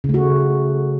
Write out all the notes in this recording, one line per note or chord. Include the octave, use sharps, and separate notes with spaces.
C#3
A3
F#4